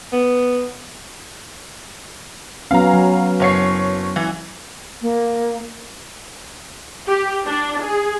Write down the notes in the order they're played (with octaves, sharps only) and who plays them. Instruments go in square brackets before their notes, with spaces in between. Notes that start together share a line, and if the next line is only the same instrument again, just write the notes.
[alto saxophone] B3
[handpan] F#3 B3 C#4 [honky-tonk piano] F5 A#5
[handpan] F#3
[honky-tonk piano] F#1 C#5 C7
E3
[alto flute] A#3
[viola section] G4
D4
G#4